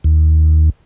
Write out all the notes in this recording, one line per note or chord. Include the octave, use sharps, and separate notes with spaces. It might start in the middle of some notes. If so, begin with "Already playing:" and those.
D#2